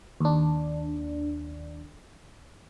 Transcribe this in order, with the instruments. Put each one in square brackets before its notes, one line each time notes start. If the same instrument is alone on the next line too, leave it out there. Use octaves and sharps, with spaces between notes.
[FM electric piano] D#2 D4